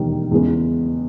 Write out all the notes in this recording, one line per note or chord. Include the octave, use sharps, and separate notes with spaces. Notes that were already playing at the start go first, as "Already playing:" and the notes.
Already playing: E1 D#2 D#3 G3
E2 C#3 G#3 B3